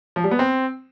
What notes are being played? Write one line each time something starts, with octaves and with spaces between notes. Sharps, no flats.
F3
G3
B3
C4